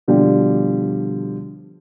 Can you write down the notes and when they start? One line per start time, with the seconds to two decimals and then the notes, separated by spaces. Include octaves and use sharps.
0.08 B2 D3 F3 G3